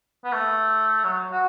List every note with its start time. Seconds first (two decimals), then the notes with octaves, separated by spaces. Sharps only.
0.24 B3
0.33 A3
1.04 F#3
1.32 F#4